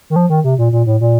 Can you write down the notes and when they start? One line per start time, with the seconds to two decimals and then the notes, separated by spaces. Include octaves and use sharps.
0.10 D#3
0.16 F3
0.30 D#3
0.44 C3
0.58 A#2
0.72 A#2
0.86 A2
1.01 A#2